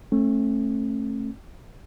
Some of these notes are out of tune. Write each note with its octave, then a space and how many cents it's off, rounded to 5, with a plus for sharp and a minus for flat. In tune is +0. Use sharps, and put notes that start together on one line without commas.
A3 +0 C#4 -45